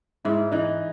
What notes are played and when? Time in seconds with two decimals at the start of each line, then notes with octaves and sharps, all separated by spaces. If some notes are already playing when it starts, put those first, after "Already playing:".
0.25 G#2 E4
0.52 E3 D#4